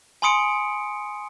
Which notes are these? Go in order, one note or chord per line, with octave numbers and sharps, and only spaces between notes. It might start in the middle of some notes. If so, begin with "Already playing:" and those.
G#5 B5 C6 D#6 C#7 D7